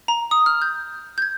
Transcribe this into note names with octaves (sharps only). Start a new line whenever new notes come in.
A#5
D#6
F6
G6
G6
G#6